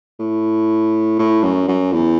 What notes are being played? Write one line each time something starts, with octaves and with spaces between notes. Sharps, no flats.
A2
A2
F#2
F#2
E2